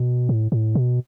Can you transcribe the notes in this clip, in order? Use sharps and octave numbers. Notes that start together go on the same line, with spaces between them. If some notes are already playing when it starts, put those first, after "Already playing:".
Already playing: B2
A2
A2
B2